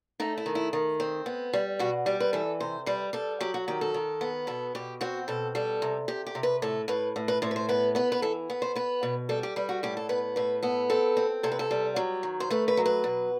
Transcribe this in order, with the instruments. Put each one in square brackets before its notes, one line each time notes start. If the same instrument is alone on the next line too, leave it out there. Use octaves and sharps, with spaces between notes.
[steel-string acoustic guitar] A3 D#4
E4
D#3
E4
D#3
C4
B3
G3
B2 F#4
G3 G4
B4
E3 A4
C3 C5
G3 B4
G3 A4
F#3 G4
F#4
D#3 G4
A4
D#3
B3
B2 A4
B2 G4
C4 F#4
B2 A4
G3 A4
C3
C3 G4
G4
C3
B4
A2 A4
A2 B4
A2
B4
A2 C5
B4
C5
B3 B4
B3 B4
B4
E3 A4
B3
C5
B3 B4
B2
G3 A4
G4
G3 B4
F#4
A2 G4
A4
B3 B4
A2 B4
B3 A4
C4 A4
C4
C3 A4
B4
A4
G3
F#3
D#3
C5
A3 B4
B4
F#3
B4
B2